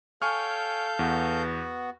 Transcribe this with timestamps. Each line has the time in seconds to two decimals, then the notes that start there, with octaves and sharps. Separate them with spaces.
0.22 A4 C#5 F5 G5 G#5 C#6 F6 G6
0.99 E2 B3 F#4